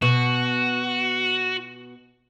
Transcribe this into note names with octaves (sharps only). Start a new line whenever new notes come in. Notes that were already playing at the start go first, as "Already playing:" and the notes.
B2 F#4